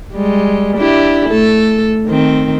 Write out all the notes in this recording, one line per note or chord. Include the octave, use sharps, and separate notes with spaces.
G3 G#3
D4 E4 G4
A3 A4
D#3 C4